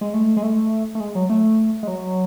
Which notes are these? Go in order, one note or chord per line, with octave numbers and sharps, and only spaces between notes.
G#3
A3
G#3
A3
A3
G#3
F#3
A3
G#3
F#3